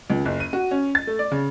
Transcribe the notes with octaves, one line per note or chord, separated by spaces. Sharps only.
C#2
F#1
D#7
F#4
C#4
A6
A3
D5
C#3